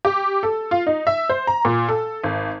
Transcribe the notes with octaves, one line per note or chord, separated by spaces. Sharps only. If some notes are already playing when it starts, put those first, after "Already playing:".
G4
A4
F4
D#4
E5
C5
A#5
A#2
A4
G#1